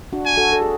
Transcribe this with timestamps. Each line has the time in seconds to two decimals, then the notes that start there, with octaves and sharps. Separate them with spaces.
0.13 D4 F#4
0.25 G#5
0.37 F#4 A4
0.53 A4
0.62 G#4